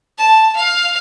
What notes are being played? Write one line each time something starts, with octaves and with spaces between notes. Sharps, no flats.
A5
F5